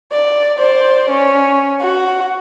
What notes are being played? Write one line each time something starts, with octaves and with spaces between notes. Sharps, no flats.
D5
C5 D5
C#4
F#4 F#5